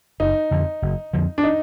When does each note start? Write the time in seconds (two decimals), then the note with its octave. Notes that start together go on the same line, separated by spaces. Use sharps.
0.20 F#1 D#4
0.51 F2 D3 F3
0.82 F#1
1.13 F2 D3 F3
1.38 D4
1.43 D#4